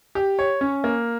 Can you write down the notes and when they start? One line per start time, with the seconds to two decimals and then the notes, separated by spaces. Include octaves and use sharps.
0.15 G4
0.39 C#5
0.61 C#4
0.84 A#3